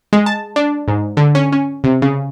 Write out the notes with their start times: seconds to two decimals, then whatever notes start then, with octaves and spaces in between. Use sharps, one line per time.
0.13 G#3
0.26 A5
0.56 D4
0.88 G#2
1.17 D3
1.35 C#4
1.52 C#4
1.84 C3
2.02 C#3